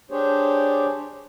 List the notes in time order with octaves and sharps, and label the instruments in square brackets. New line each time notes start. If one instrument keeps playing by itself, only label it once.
[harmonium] D4 G4 G#4 C5 C#5